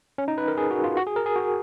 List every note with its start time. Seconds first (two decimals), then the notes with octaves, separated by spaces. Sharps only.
0.18 C#4
0.28 D#4
0.38 B4
0.48 A#4
0.58 G#4
0.71 F#4
0.84 F4
0.97 F#4
1.07 G#4
1.16 A#4
1.26 G#4
1.36 F#4